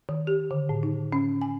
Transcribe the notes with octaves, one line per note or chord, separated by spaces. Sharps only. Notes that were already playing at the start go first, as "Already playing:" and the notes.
D#3
G4
D3
A2
D#4
C#4
G#5